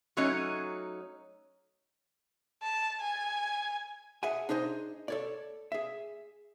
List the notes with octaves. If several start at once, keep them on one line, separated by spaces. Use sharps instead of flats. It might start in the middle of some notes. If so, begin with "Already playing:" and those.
F#3 A3 C#4 D#4 F#4 C#5
A5
G#5
G#4 E5 F#5 G#5
D4 D#4 G#4 C5 D#5
A4 C#5 D5
G#4 E5